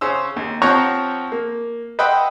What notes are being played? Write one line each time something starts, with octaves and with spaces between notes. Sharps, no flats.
C#3 C#4 C5 E6
D#2
F3 C4 C#5 F#5 A#5 C#6
A#3
B4 D#5 E5 F#5 G5 C6